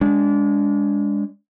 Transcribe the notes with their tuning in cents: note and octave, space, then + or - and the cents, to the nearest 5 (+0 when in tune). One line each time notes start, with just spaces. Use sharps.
G#3 -15 D4 -30